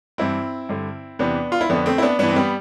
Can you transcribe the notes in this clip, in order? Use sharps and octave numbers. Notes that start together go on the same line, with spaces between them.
G2 E3 C4 E4
G2 D3
E2 C3 E3 B3 D4
F4
E4
F2 D3 B3 D4
A3 C4
E4
B3 D4
G2 E3 B3 D4
C4
G3 B3